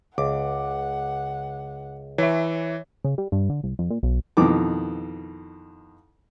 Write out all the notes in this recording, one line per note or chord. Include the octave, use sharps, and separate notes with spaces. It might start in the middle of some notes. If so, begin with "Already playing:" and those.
C#2 F#5 D6
E3 C#5 E5
C#3
G3
G2
D3
C2
F2
A#2
B1
F2 B2 D#3 E3 D6